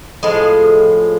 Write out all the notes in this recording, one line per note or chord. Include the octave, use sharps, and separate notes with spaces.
A2 F3 G#3